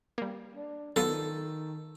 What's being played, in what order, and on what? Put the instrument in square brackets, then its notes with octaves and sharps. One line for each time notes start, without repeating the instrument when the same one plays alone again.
[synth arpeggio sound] G3 A#3
[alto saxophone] D4
[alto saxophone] D#3 [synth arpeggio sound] F#3 B3 F4 [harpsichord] A4